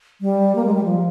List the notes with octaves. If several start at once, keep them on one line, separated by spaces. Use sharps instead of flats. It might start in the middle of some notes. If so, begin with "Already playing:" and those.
G3
A#3
G#3
G3
F3